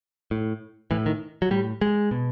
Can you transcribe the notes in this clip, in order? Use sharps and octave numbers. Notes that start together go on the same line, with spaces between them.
A2
A2 E3
D#3
F#3
A2 G3
G#3
B2